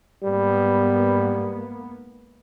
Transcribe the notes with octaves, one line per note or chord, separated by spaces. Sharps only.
G#2 G3 A#3 B3